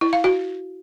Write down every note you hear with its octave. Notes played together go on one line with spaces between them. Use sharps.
E4
F5
F#4